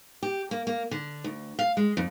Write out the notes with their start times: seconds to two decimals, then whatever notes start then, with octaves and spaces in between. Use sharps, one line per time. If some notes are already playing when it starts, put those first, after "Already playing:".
0.23 G4
0.51 A#3
0.67 A#3
0.91 D3
1.24 D2
1.59 F5
1.77 G#3
1.97 F2